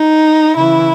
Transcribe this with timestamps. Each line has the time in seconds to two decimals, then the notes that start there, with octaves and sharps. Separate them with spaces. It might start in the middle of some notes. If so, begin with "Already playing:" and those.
Already playing: D#4
0.56 C#3 E3 E4